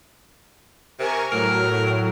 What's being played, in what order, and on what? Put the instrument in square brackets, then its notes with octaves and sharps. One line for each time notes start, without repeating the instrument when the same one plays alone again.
[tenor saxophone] C3 [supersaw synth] A#4 G#5 C#6
[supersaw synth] A2 F#3 [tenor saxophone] A#4